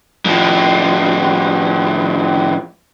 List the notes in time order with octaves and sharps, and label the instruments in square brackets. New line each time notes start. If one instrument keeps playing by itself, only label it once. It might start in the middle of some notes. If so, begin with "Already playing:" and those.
[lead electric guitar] A2 F3